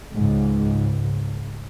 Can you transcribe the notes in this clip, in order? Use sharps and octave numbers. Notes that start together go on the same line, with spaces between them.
C#2 G#2